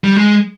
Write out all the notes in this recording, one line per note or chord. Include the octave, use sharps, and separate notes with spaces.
G3
G#3